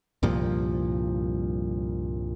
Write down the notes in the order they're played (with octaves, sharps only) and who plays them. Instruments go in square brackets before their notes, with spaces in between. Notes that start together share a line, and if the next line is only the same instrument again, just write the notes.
[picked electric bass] C2 G2 A#2 F3